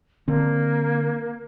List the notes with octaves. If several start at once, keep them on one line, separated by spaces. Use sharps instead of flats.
D3 A#3 C4